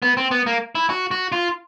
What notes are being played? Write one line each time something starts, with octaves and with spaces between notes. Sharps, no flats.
B3
C4
B3
A#3
E4
F#4
F#4
F4